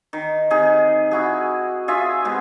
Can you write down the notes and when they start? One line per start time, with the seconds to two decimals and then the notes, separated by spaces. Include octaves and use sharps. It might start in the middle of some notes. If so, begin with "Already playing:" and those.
0.13 D#3
0.50 C3 D#3 G#4
1.11 E4 F#4 G#4
1.88 F4 G#4 E5
2.25 C3 G#3 B3